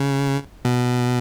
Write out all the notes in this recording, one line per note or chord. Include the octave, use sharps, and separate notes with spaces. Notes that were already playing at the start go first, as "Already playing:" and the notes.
Already playing: C#3
B2